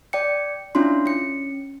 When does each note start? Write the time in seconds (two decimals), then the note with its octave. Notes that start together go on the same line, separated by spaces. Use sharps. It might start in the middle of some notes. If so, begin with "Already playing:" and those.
0.13 D5 G5 C#7
0.75 C#4 D4 E4 F4 C6
1.06 C#4 C#7